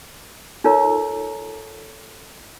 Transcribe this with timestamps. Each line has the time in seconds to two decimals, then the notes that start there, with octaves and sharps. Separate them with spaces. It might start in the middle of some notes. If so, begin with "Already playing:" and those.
0.64 D#4 F4 A4 A#4 C#5 A#5